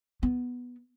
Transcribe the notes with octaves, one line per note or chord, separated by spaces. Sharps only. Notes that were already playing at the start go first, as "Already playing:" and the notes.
B3